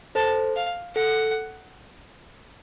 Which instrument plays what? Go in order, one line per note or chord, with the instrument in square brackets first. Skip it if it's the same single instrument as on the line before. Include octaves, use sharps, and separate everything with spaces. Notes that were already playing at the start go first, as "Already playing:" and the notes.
[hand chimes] A4 C5 [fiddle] A5
[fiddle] F5
[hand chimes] A4 [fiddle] F#5